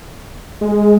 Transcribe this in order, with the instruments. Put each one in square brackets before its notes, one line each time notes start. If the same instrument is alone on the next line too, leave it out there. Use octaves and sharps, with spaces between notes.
[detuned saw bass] G#3